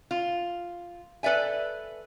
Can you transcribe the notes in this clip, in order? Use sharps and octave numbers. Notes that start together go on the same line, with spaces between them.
F4
A4 B4 D5 E5 G#5